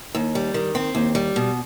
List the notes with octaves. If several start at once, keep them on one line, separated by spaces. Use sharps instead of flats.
D#2
G3
D#3
C4
D#2
G3
B2